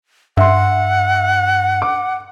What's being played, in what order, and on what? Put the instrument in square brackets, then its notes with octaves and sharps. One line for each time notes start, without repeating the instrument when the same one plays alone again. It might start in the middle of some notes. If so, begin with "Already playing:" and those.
[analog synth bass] G2 [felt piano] E5 C6 [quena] F#5
[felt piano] D6